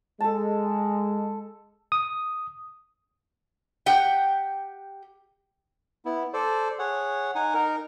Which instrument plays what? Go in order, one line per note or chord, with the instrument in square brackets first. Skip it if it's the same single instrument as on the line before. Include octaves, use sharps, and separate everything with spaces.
[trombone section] G#3 [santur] A4 A5
[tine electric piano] D#6
[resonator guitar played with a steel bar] G4 F#5 G5
[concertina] B3 E4
A4 C5 D5
G#4 C#5 F#5
D#4 F#5 G#5
D#4 A#4